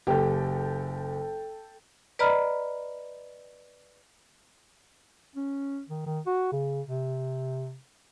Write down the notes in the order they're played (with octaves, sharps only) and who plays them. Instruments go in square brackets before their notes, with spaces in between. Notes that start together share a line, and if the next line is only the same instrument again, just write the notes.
[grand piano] F#1 G4 [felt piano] A4 G5
[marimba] B4 D5 D#5 A#5 B5 F6
[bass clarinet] C#4
D#3
D#3
F#4
C#3
C3